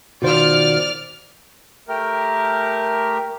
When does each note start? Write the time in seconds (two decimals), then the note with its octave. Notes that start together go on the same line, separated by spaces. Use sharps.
0.22 B2 D#3 F4 F#4 C5 D5 F6
1.88 A3 G4 A#4